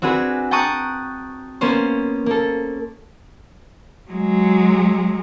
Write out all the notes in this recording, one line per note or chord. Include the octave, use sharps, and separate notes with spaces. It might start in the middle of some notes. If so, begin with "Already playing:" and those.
C4 D4 F#4 G#4 B4
G5 A5 A#5 C#6 D#6 F#6
A#3 B3 C#4 C5
A#3 A4
F#3 G#3